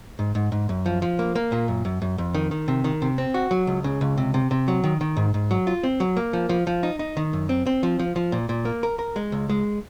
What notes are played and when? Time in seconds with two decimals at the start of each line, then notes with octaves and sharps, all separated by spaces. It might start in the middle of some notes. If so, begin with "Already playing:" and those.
0.19 G#2
0.35 G#2
0.52 G#2
0.69 F#2
0.86 F3
1.02 F3
1.19 A#3
1.35 A#3
1.52 A#2
1.68 F#2
1.85 F#2
2.02 F#2
2.18 F2
2.34 D#3
2.51 D#3
2.68 C3
2.84 D#3
3.02 C3
3.18 C4
3.34 F#4
3.51 F#3
3.67 C#2
3.84 C#3
4.01 C#2
4.18 C3
4.34 C3
4.51 C3
4.68 F#3
4.84 D#3
5.01 D#3
5.17 G#2
5.34 G#2
5.51 F#3
5.67 F4
5.83 C4
6.00 F#3
6.17 A#3
6.33 F3
6.49 F3
6.67 F3
6.83 D#4
6.99 D#4
7.17 D#3
7.33 F#2
7.49 C4
7.67 C4
7.83 F3
7.99 F3
8.16 F3
8.32 A#2
8.49 A#2
8.65 A#3
8.83 A#4
8.99 A#4
9.16 G#3
9.32 C#2
9.49 G#3